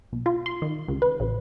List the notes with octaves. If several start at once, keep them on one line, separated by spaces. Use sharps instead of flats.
B1
F4
C6
D#3
C#2
B4
A1